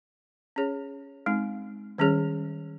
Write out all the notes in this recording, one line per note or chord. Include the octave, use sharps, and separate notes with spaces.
C#4 G#4 C#5
G#3 C4 D#4
D#3 G3 C#4 G#4 C#5